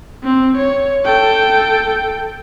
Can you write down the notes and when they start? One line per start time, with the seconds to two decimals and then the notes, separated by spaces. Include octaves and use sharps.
0.24 C4
0.57 C#5
1.05 A4 G5